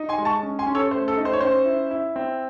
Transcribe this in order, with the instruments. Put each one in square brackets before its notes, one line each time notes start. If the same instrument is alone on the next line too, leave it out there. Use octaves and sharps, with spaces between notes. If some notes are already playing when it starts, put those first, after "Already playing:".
Already playing: [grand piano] D#4
G#5 C6
G#3
A5 C#6
C#4
G#5 C6
C#4
A4 C#5
A3 C5
A4
D#4
C5
C#5
C#4 C5
E4
E4
C4